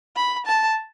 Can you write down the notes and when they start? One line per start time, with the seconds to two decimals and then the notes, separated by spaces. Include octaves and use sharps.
0.16 B5
0.46 A5